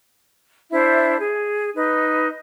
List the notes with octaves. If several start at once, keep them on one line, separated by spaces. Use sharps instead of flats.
D4 E4 C5 E5
G#4
D#4 B4